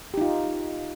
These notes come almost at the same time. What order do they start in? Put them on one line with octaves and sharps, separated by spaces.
G4 D#4 F4